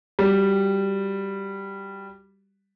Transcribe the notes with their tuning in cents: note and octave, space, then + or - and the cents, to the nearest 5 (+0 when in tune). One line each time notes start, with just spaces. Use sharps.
G3 +0 F#4 +0